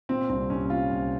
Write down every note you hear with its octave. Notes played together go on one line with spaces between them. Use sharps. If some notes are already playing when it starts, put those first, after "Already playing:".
A#2 C4
C2 C4
C2 C#4
A#2 F4
C2